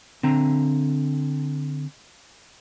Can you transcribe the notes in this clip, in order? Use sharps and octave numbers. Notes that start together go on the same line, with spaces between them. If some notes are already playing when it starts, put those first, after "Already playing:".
D3 C4 A#5